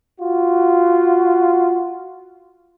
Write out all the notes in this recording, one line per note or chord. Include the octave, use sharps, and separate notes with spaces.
F4 F#4